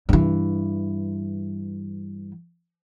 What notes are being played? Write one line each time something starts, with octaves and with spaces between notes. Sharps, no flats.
G2 E3